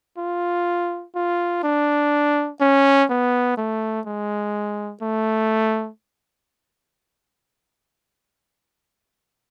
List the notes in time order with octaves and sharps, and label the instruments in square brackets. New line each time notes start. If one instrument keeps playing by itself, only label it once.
[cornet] F4
F4
D4
C#4
B3
A3
G#3
A3